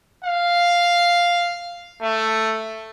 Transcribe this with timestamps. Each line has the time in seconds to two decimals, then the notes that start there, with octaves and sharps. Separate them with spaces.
0.24 F5
2.02 A3